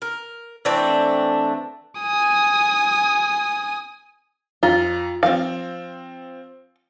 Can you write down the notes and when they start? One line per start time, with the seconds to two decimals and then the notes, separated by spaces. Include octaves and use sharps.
0.02 A#4
0.65 E3 A3 C4 D4
2.01 G#5 D#6
4.63 F2 F4 A#5
5.23 F3 C4 F5